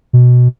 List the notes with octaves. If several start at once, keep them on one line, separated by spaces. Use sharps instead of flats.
B2